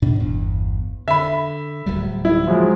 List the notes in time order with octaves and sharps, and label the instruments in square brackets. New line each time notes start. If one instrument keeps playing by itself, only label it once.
[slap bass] G#2 B2 D4
G1 E2
[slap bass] D3 [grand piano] E5 B5
[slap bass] D1 F#3 G3
[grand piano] E4
F3 F#3 G#3